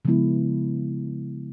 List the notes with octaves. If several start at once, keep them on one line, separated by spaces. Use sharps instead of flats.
C#3 F3 G#3 B3 E4